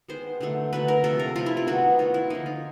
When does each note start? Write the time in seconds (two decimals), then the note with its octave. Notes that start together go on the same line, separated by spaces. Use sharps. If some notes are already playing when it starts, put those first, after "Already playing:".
0.08 D#3 G#3 B3 C5
0.41 D3 F#3 A3
0.73 D3 F#3 A3 B4
0.88 A#4
1.04 C3 F3 A3 A4
1.19 A#4
1.36 C3 F3 A3 F4
1.46 E4
1.57 F4
1.67 D#3 F#3 B3 F#4
1.99 D#3 F#3 B3 F4
2.14 E4
2.30 D3 F3 A#3 D#4
2.46 F4